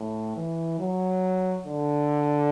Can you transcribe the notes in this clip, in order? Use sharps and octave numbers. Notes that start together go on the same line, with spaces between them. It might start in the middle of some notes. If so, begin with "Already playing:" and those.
Already playing: A2
E3
F#3
D3